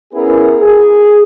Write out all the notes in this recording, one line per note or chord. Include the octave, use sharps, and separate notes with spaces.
B3 C#4 E4 G#4 A#4 B4
G#4